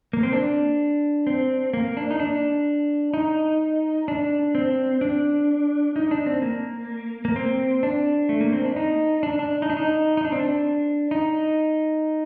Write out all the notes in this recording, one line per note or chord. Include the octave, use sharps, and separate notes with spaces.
A#3
C4
D4
C4
A#3
D4
D#4
D4
D#4
D4
C4
D4
D#4
D4
C4
A#3
A#3
C4
D4
A3
A#3
C4
D4
D#4
D4
D4
D#4
D4
D#4
D#4
D4
C4
D4
D#4